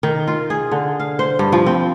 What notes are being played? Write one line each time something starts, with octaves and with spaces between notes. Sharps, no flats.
D#3
F4
G#4
D3
F5
C5
G2
F3
C4